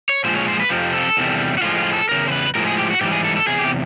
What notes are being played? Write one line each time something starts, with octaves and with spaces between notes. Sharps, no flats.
C#5
A#2 F3 G#3 C5
C#5
C5
B4
F2 C3 F3
A4
E2 C3 D#3 G3
F#4
A2 F3 G#3 F4
F4
A4
E2 C#3 A#4
C5
B4
A2 F3 G#3 A#4
G#4
G4
F#4
G#2 E3 G3 G4
G#4
A4
A4
E2 C3 G#4
G4